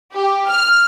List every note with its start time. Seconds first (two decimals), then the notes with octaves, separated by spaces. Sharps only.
0.14 G4
0.48 F6